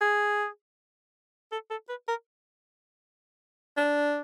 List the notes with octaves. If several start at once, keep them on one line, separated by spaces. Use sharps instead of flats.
G#4
A4
A4
B4
A#4
D4